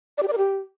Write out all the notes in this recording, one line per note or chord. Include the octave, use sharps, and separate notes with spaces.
D5
G4
D5
A#4
G4